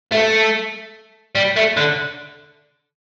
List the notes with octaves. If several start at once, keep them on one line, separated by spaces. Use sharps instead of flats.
A3
G3
A3
D3